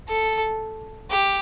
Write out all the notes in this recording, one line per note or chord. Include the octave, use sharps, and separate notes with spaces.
A4
G4